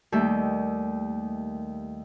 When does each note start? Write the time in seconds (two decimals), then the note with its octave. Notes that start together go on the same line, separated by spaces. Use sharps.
0.12 D#2 D#3 G3 A3 E5 G6